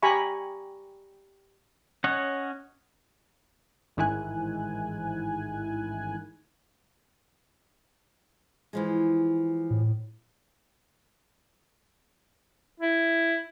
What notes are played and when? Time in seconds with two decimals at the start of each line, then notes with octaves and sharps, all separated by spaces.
0.03 G4 G#5 A#5 B5 C#6
2.04 C#4 C#5 D#5 F#5
3.97 A1 G#2 D#3 E4 G#5 F#6
8.73 E3 F3 G#3
9.70 A2
12.80 E4